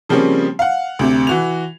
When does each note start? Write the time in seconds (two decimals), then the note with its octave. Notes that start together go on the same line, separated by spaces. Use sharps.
0.09 C#3 F3 G3 A#3 C4 C#4
0.59 F5 F#5
0.99 D2 C3
1.27 E3 F#4 F7